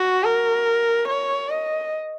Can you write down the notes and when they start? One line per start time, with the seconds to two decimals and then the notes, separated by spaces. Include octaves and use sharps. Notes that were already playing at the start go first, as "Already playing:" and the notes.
Already playing: F#4
0.24 A#4
1.08 C#5
1.49 D#5